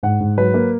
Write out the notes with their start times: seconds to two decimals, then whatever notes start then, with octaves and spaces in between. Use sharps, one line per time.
0.03 G#2 F#5
0.20 G#2
0.38 F#3 B4
0.54 A#3